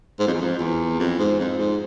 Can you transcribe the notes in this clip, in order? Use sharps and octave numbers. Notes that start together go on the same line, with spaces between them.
G#2
F2
E2
F2
E2
F2
G#2
F2
G#2